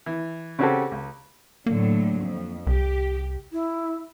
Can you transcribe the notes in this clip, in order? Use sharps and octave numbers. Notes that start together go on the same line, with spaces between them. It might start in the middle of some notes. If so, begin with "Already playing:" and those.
E3
C#3 C4 C#4 F#4 G4 A4
C#2
A2 D3 F#3 A#3
F2
C2 G4
E4